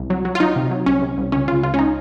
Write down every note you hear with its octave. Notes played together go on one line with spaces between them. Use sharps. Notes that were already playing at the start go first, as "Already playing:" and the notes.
Already playing: C2
F#3
F#3
F4
F#3 D#4
C3
F#3
C2 C#4
C3
C2
C#2 C#4
C#3 F4
C#2 F4
C#4
D#4